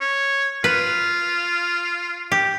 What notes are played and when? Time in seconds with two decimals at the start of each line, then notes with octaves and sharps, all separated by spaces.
0.01 C#5
0.64 F4 B4
2.32 G4